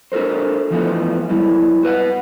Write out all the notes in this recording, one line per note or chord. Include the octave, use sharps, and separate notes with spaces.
D4 F#4 A4 A#4 C5
E3 F3 A3 B3 F4 A4
G2 F#3 G3 E4
F#4 B4 F5 F#5